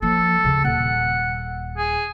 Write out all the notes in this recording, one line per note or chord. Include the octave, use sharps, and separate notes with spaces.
F3 A#3 A4
D2 C#3
D#1 F#5
G#4